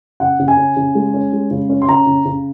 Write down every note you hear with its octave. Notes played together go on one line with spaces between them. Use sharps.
C#3 F#5
C#3
G#5
C#4
C#3
G#3
C#4
G#3
C#3
C#4
C6
C#3 A#5
C#3
C#3